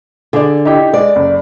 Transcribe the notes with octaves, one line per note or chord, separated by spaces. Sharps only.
D3 G#4 D5
D#4 E4 G4
G#3 D5
F#1